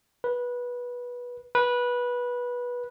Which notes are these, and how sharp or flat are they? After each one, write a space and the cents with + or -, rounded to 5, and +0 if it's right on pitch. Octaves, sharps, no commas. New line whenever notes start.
B4 -15
B4 -15